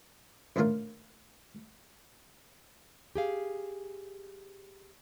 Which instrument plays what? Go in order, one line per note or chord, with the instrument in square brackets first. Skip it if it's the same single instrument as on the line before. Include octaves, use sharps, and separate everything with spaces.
[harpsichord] A1 A#2 D3 A3 F4 A#4
[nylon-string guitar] G4 G#4 F5